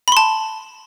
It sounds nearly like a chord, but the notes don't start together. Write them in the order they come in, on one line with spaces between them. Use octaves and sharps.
B5 C6 A5